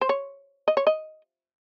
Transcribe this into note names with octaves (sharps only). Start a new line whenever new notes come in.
C5
C#5
D#5
C#5
D#5